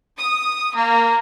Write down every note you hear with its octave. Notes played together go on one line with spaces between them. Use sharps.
D#6
A#3